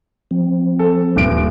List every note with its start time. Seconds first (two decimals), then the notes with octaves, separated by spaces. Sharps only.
0.31 F3 C4
0.79 A4
1.16 D#1 G2 D7